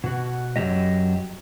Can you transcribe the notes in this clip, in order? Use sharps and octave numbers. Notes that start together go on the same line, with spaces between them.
B2 F#4
F#2 D#3 F#3 G4 D#5